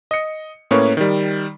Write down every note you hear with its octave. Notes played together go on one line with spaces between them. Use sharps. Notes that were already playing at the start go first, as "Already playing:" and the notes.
D#5 C#7
A2 A#3 C#4 B4 C#5
D#3 G3